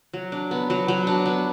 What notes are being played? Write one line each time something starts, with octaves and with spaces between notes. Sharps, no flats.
F#3
D4
B3
F#3
F#3
D4
B3